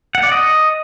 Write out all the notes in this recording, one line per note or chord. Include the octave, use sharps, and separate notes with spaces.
F#5
D5
D#5